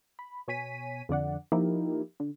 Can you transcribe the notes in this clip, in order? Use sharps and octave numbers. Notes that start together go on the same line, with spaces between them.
B5
B2 C#5 G#5 B6 D#7
F2 D3 D5 F#5
F3 A#3 D#4 E4 G4 A#4
D3